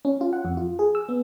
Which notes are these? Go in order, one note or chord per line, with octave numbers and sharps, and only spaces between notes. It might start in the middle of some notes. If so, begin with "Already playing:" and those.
C#4
F4
F#5
F2
F4
G#4
E6
B3